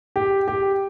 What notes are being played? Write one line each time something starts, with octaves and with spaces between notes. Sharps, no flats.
G4
G4